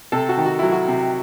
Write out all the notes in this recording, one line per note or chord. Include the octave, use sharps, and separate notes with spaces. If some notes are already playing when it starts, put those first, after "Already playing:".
C3 A4
F#4
D#3
F#4
F#3 E4
F#4
C3